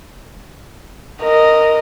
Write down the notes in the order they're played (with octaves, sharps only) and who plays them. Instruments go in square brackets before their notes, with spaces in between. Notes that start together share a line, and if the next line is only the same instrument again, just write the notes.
[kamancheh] A#4 D#5